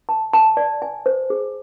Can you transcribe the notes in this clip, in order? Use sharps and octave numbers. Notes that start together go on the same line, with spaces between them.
A5
A5
D5
G#5
C5
G#4